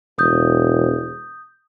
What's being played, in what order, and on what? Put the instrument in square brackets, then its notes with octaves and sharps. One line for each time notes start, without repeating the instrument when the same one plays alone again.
[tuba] E1 [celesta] D#6 G6